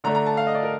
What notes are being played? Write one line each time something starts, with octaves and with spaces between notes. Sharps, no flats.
D3 A3 D4 A#5
A#5
A5
F5
D#5
D5
A#4